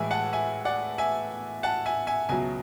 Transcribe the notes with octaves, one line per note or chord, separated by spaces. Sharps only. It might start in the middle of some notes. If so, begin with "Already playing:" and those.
Already playing: A2 E3 G#3 E5 G#5
F#5 A5
E5 G#5
D5 F#5
E5 G#5
F#5 A5
E5 G#5
E5 G#5
C#2 B2 F#3 E5 G#5